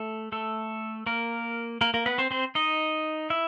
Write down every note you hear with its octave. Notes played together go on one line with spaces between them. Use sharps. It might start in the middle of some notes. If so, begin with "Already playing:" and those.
Already playing: A3 A4
A3 A4
A#3 A#4
A#3 A#4
A#3 A#4
B3 B4
C4 C5
C4 C5
D#4 D#5
E4 E5